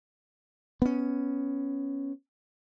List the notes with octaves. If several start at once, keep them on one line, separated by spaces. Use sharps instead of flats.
B3 C#4